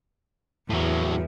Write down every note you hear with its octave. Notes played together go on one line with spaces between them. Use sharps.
E2 A2 F#3